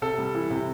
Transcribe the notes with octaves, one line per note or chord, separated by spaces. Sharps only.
C3 A4
G3
E3
C3